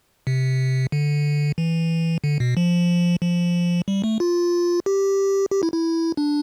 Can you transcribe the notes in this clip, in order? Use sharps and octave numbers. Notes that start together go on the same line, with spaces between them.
C3
D3
E3
D3
B2
F3
F3
G3
A3
F4
G4
G4
E4
E4
D4